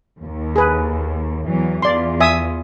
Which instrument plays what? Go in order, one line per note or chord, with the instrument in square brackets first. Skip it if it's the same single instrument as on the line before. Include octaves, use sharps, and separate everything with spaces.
[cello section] D#2
[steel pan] G#4 B4
[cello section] E2 E3 F#3
[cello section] E2 F4 [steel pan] D5 C6
[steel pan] E5 G#5 D#6